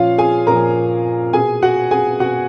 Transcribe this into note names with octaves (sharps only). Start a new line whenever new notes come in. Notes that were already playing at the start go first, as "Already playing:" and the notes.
Already playing: A#2 F3 C#4 F4 C#5 F5
G#4 G#5
A#2 F3 A#4 A#5
B2 G#4 G#5
F#4 F#5
G#4 G#5
B2 F#4 F#5